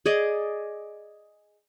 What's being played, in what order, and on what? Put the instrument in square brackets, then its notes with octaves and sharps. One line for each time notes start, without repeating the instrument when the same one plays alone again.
[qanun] G#4 D5 D#5